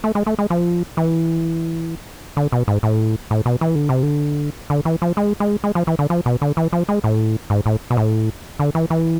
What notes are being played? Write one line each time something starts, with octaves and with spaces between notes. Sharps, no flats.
A3
G#3
A3
G#3
F3
E3
D3
B2
G#2
A2
A2
B2
E3
D3
C3
D3
D3
E3
F3
G#3
G#3
G#3
F3
E3
D3
F3
B2
D3
E3
F3
G#3
A2
G#2
A2
B2
A2
D3
E3
E3